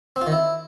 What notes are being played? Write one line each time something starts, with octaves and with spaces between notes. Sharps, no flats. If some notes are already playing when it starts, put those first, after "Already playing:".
C4
F4
D#3
E4